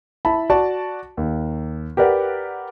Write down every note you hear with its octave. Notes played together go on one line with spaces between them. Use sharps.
E4 A5 B5
F#4 D5 A5
D#2
G4 A#4 B4 D5 F#5